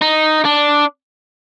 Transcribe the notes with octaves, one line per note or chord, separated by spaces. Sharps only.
D#4
D4